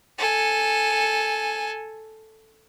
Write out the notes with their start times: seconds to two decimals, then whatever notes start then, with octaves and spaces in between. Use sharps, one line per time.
0.18 A4 G#5